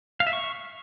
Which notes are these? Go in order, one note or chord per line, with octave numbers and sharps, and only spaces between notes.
F5
E5
C#6